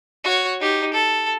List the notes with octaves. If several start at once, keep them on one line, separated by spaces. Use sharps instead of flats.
F#4 C#5
D#4 G4
A4